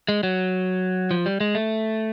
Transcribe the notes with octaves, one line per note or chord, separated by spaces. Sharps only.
G#3
F#3
F3
G3
G#3
A3